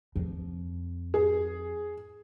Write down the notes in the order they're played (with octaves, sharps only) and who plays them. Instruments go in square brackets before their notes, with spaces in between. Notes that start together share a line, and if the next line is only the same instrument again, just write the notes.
[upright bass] F2
[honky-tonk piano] G#4